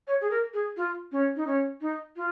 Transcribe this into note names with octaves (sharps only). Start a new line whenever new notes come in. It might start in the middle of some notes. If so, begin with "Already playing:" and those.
C#5
G#4
A#4
G#4
F4
C#4
D#4
C#4
D#4
F4